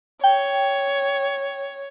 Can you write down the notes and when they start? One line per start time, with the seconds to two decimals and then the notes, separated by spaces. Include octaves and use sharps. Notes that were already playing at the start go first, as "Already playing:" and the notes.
0.24 C#5 G5